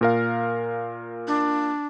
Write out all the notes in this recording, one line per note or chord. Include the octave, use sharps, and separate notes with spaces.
A#2 A#4 F5
D4